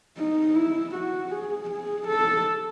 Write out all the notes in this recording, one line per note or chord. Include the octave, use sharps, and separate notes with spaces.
D#4
E4
F#4
G#4
G#4
A4